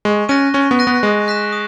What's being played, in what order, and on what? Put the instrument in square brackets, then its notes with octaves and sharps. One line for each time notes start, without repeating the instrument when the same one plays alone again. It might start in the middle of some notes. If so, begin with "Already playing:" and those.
[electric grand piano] G#3 [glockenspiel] C#6
[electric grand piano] C#4 [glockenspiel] F#6 A#6 D#7
[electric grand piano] C#4 [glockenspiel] C#6
[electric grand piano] B3
[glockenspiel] F#6 A#6 D#7
[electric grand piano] B3
[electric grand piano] G#3 [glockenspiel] D#6
[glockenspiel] F#6 B6 E7
D#6